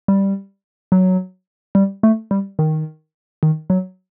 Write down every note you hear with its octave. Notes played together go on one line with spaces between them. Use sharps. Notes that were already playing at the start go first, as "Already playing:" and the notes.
G3
F#3
G3
A3
G3
D#3
D#3
F#3